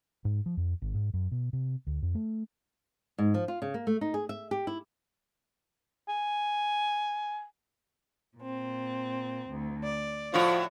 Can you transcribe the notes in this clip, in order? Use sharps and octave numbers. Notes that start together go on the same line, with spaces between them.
G#2
F3
F2
G#1
G#2
F#2
B2
C3
D2
F2
A3
G#2
F3
F4
C#3
A#3
A3
D#4
G#4
E5
G4
E4
G#5
A#2 C4
D2
D5
A2 F3 F#4 C#5